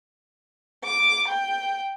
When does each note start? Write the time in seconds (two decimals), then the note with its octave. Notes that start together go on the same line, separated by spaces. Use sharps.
0.85 D6
1.29 G5